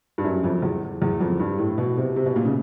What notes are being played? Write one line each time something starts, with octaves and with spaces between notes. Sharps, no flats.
G2
F#2
F2
E2
E2
F2
G2
A2
B2
C3
C3
B2
A#2
C#3